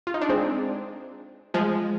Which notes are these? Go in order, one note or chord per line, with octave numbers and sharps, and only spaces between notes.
F4
D#4
D4
G#3 C4
F3 G#3